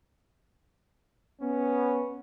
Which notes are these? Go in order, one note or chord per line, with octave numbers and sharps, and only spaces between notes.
B3 C#4